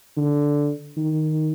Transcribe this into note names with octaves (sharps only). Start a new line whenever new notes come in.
D3
D#3